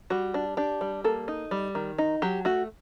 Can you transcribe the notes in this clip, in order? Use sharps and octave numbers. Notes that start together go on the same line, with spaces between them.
G3 F#4
D4
D4 G4
G3
A#3 A4
D#4
G3
D#3
D#4
F#3 G4
A3 F#4